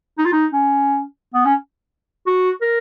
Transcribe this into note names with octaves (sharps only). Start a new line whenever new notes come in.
D#4
F4
D#4
C#4
B3
C#4
F#4
A#4